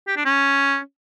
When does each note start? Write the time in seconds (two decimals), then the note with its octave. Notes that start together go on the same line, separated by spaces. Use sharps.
0.08 G4
0.16 D4
0.25 C#4